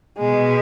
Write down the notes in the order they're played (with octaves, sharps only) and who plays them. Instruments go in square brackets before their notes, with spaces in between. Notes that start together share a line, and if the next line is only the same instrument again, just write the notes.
[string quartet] B2 G#3